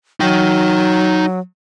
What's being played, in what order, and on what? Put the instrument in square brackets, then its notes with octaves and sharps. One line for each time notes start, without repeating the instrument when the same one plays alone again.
[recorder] F#3 [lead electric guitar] D#4 G5